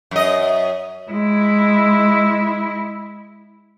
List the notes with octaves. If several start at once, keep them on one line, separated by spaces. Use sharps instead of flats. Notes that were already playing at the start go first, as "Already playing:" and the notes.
F#2 D#5
G#3 E4